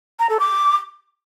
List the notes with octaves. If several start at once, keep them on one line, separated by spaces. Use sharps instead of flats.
A#5
A4
D6